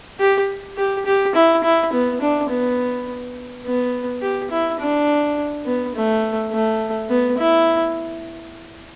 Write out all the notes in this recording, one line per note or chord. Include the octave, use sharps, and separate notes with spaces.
G4
G4
G4
E4
E4
B3
D4
B3
B3
G4
E4
D4
B3
A3
A3
B3
E4